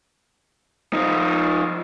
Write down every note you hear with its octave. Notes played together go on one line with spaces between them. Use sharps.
F3 D#4